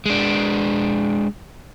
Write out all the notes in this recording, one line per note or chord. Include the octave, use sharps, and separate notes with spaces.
G#3 D4